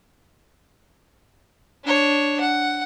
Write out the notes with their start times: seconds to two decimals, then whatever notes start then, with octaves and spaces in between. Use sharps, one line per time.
1.84 D4 C#5
2.41 F#5